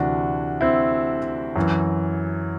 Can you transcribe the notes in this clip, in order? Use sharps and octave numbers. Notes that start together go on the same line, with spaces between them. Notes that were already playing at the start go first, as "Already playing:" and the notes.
Already playing: D2 C3 E3 D4 F#4
C4 E4
F#2 E3